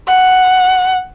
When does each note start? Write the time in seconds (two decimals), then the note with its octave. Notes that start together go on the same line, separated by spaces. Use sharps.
0.08 F#5